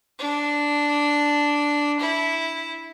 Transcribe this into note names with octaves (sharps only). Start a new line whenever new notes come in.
D4
E4